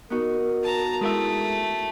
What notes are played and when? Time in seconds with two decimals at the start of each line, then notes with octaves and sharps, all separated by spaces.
0.10 B3 D#4 F#4 A#4
0.63 A5 A#5
1.01 G#3 A3 E4 A#4 E5